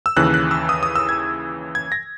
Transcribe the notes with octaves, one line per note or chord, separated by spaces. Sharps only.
E6
D#2 C#3 E3 F#6
F#6
E6
D#6
D#6
E6
G#6
G#6
A#6